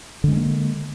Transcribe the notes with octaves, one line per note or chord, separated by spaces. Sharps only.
D3 G#3 A#3 C#4